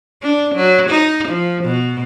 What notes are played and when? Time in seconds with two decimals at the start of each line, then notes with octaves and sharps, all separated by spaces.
0.22 D4
0.55 F#3
0.89 D#4
1.28 F3
1.64 B2